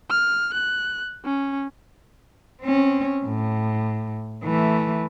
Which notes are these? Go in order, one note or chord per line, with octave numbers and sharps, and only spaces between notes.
F6
F#6
C#4
C4 C#4
A2
E3 A3